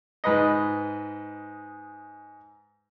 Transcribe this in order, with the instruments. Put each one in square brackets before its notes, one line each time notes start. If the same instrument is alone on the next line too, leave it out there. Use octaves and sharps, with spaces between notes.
[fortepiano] G#2 B4 D#5